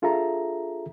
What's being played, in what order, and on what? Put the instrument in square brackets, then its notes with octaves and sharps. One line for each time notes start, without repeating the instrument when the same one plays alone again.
[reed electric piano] D4 F4 G#4 A4 E5 A#5